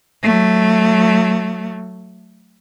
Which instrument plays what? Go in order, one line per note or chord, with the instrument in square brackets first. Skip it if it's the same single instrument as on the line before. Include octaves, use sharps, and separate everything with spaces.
[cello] F#3 A3